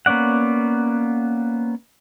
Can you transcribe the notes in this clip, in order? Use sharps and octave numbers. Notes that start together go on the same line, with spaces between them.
A#3 B3 C#4 D5 F#5